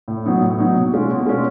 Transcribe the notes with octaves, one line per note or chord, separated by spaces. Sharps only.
A2
F#3 B3 D#4
A2
F#3 B3 D#4
B2
G#3 C#4 F4
B2
G#3 C#4 F4